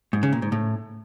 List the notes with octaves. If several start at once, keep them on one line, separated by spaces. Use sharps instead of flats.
G#2
C#3
A#2
G#2
A2